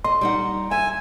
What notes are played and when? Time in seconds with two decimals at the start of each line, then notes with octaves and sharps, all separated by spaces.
0.04 D#5 C6
0.21 G3 D#4 F#5
0.71 E5 G#5